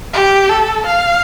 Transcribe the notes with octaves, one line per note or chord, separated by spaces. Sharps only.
G4
A4
F5